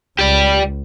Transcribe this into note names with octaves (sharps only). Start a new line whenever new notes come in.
C#2 G4 D5